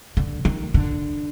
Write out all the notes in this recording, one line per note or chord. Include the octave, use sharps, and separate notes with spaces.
D3
D#3
D3